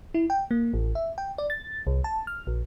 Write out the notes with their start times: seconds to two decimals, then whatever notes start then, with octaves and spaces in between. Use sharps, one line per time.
0.14 E4
0.30 G5
0.51 A#3
0.73 A1
0.95 E5
1.18 G5
1.38 D5
1.50 A6
1.87 C2
2.04 A5
2.27 F6
2.47 A#1